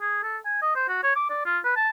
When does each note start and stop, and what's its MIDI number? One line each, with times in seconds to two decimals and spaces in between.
0.01 0.23 68
0.23 0.38 69
0.45 0.57 80
0.62 0.72 75
0.75 0.86 72
0.88 1.01 66
1.03 1.11 73
1.16 1.26 86
1.29 1.41 74
1.45 1.58 65
1.64 1.74 71
1.76 1.89 81